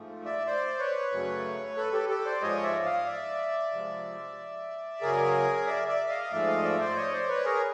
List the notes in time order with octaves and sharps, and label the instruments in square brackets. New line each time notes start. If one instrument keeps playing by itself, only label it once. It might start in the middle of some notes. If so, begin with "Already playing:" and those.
Already playing: [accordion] G#2 F3 A3
D5 E5
C5 D5
B4 C#5
F#2 C#3 F#3 A3
A4 B4
G4 A4
G4 A4
C5 D5
G#2 F3 G#3 C#5 D#5
D5 E5
D#5 F5
D5 E5
C3 F3 G#3
F#2 C#3 F#3 G#4 A#4
D5 E5
D5 E5
D#5 F5
D#5
G#2 F3 A3 D5 E5
D#5 F5
D5 E5
C5 D5
C#5 D#5
C5 D5
B4 C#5
G#4 A#4